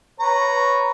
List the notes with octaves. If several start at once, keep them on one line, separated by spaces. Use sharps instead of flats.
B4 C#5 A#5